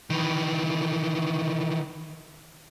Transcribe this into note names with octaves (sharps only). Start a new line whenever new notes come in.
D#3 E3